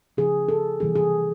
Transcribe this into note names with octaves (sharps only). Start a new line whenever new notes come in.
C#3 F3 A3 G#4
A4
C3 E3 G3 A#3 G#4
G#4